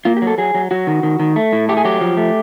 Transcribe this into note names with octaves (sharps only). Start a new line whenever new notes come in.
A#3 F4
G4
F#3
A4
F#3 G#4
F#3
F#3 F#4
D#3
D#3
D#3
A3
A2
A3 G4
G#4
F#3 G4
F3
A3